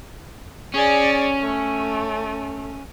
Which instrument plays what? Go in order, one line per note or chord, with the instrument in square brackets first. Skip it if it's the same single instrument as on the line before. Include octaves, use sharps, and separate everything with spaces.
[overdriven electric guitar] C#4 [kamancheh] G#4 D5
[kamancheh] A3